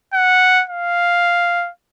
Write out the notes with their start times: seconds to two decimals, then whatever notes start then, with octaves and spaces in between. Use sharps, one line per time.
0.13 F#5
0.69 F5